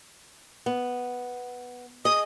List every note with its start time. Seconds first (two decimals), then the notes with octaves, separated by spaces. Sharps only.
0.66 B3
2.05 G#4 D#5 D#6